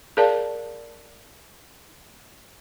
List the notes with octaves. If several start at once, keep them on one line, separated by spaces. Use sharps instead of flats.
G#4 A#4 D5 F5 A5